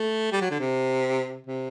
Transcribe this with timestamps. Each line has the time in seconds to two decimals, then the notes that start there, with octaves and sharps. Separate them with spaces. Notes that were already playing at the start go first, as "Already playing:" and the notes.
Already playing: A3
0.32 G3
0.41 F#3
0.51 D3
0.60 C3
1.46 C3